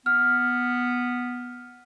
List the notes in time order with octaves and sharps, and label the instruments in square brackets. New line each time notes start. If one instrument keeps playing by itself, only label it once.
[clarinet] B3 [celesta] F6